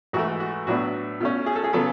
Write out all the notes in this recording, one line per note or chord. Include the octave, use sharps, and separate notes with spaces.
G#2 E3 A3 F#4
F#4
A2 F#3 B3 D4 F#4
B2 A3 C#4
G#4
A4
G#4
C#3 F#3 B3 A4